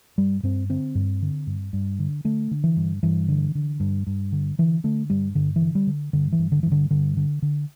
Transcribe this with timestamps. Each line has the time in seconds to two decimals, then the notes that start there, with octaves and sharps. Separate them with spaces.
0.18 G2 G3
0.43 G2 C4
0.69 D3 C4
0.95 G2
1.22 D3
1.47 G2
1.73 G2
1.99 D3
2.24 D3 A3
2.51 D3
2.64 E3
2.77 G2
3.03 G2 E3
3.28 D3
3.55 D3
3.80 G2
4.07 G2
4.32 D3
4.58 D3 E3
4.84 D3 A3
5.10 G2 G3
5.35 G2 D3
5.56 E3
5.62 D3
5.75 G3
5.87 D3
6.13 G2 D3
6.32 E3
6.39 G2
6.52 D3
6.63 G2 E3
6.72 D3
6.91 G2 D3
7.17 D3
7.42 D3